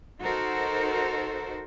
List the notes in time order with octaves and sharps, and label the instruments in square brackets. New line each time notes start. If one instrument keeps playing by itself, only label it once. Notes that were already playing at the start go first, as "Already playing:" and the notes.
[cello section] D#4 F#4 A4 A#4 C5